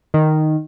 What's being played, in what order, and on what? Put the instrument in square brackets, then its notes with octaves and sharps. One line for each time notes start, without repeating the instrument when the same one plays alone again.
[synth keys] D#3